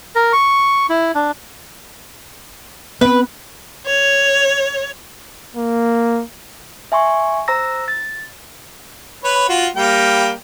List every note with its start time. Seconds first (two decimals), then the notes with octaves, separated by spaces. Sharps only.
0.15 A#4
0.33 C#6
0.89 E4
1.15 D4
3.01 B3 C4 B4
3.85 C#5
5.55 A#3
6.92 E5 G#5 C6 C#6
7.48 C5 A#5 E6 A#6
7.88 A6
9.24 B4 C#5
9.49 F4 F#4
9.76 G3 A#3 G5